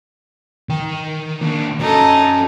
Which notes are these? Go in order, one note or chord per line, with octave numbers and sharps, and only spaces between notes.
D#3 G5
A#3 D4
F#3 C#4 D#4 A4